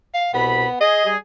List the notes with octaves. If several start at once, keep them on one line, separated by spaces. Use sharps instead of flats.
F5
C2 B2 B3 B5
G#4 D#5
G3 G#4